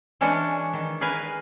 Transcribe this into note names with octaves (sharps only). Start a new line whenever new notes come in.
E3 G#3 C#4 D4 F#4
D#3
G#4 A#4 B4 F5 G#5